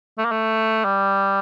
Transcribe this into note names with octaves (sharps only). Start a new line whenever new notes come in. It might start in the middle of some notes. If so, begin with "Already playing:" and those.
A3
A#3
A3
G3